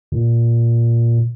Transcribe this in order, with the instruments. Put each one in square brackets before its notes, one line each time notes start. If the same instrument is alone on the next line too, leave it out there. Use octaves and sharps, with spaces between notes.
[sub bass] A#2